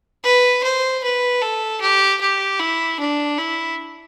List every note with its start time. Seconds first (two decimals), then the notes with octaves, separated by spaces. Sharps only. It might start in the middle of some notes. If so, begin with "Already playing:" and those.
0.24 B4
0.63 C5
1.04 B4
1.42 A4
1.81 G4
2.21 G4
2.60 E4
3.00 D4
3.39 E4